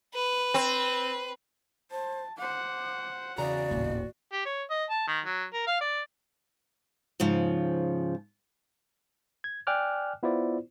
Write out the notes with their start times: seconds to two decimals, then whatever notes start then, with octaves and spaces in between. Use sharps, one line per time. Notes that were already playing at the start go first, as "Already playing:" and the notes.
0.14 B4
0.54 C4
1.91 C5 A5
2.38 C5 F#5 D6
3.38 E2 C#3 F#4 D5 A#5
3.71 D#1 A1
4.32 G4
4.45 C#5
4.70 D#5
4.90 A5
5.07 D#3
5.25 F#3
5.53 A#4
5.67 F5
5.81 D5
7.20 G#2 C#3 F3
9.44 G#6
9.67 D5 G5 G#5 D6 F6 F#6
10.23 B3 E4 F4 C5 D5